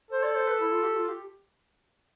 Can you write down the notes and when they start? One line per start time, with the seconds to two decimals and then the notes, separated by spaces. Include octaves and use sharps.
0.11 A4 C5
0.23 D5
0.35 C5
0.47 B4
0.60 E4
0.72 F4
0.83 G4
0.96 F4
1.09 G4